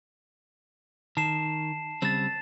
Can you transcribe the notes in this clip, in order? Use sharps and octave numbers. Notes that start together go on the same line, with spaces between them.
D#3 A5 C7 E7
C#3 G3 C4 A6 E7